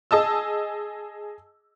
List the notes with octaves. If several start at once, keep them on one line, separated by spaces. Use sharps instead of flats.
G#4 D#5 A5 E6